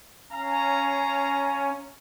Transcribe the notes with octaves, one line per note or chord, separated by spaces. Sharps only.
C#4 F5 A#5